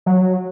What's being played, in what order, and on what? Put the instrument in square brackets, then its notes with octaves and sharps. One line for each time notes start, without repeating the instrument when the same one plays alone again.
[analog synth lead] F#3